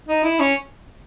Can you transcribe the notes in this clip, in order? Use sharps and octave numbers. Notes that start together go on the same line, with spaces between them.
D#4
E4
C#4